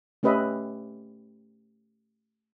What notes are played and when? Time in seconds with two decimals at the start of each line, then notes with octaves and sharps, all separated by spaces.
0.23 A3 C#4 G4 B4 D#5 E5